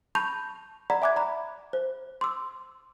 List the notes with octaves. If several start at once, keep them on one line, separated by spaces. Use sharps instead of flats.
A5 B5 C#6 G6 F7
D5 F#5 A#5 B5 B6
E5 G#5 D6 F#6 G#6
D5 A#5 B5
C5
C6 D6 E6